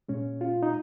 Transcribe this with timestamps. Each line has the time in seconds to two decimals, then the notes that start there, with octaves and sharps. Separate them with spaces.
0.09 A#2 G#3 C#4
0.41 F4
0.63 D#4